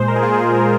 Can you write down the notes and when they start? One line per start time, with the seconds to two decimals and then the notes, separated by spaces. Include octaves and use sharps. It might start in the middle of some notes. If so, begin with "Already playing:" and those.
Already playing: A#2 G#3 C5
0.08 A#4
0.16 G#4
0.23 F4
0.32 G#4
0.44 G#4
0.54 A#4